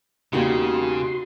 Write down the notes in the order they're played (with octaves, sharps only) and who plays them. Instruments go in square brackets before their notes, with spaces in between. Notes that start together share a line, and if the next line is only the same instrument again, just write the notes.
[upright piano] E1 A#3 [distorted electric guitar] C#3 [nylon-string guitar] D#4 G4 [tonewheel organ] F#4 C6